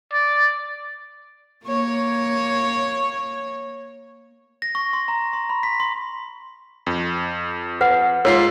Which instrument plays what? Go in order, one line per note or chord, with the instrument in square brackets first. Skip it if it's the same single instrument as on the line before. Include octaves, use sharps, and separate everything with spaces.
[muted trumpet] D5
[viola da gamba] A#3 C#5
[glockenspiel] A#6
C#6
C6
A#5
C6
B5
B6
C6
[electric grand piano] F2
[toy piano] B4 F#5
[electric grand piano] G#2 F4 C7 [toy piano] A#4 C#5